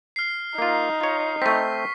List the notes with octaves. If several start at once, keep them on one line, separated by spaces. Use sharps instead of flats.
F6 C7
A#3 D#4 F4
F4 C#5
A3 C4 C#6 B6